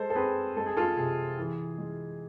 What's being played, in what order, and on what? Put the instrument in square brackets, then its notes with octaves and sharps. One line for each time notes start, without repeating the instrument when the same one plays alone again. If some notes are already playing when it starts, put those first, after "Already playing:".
Already playing: [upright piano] G#3 A4 C5
A4
C4 G#4 B4
G#3 A4
G#4
F4 A4
C3 G#4
E3
G#3